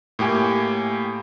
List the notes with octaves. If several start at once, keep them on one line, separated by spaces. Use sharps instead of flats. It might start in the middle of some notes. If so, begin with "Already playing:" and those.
A2 A#3 G4 G#5